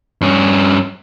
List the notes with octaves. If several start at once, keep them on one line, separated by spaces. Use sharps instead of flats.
G2 C#4